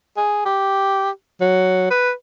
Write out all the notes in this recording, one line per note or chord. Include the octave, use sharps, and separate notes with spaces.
G#4
G4
F#3
B4